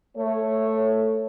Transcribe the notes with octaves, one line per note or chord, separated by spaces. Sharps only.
A3 C#5